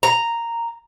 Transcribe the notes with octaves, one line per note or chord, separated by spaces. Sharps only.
A#5